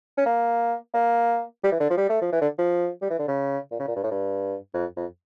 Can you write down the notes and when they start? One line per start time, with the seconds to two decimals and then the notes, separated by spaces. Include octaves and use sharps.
0.17 C#4
0.26 A#3
0.94 A#3
1.64 G3
1.72 E3
1.80 D3
1.90 F3
1.98 G3
2.09 A3
2.21 F3
2.32 E3
2.42 D3
2.58 F3
3.02 G3
3.10 E3
3.19 D3
3.28 C#3
3.71 A#2
3.79 C#3
3.88 A#2
3.96 G2
4.03 A2
4.11 G2
4.74 F2
4.97 F2